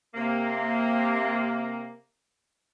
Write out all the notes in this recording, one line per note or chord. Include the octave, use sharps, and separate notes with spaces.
C3 A#3